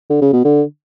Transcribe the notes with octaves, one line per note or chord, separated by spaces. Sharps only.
D3
C#3
B2
D3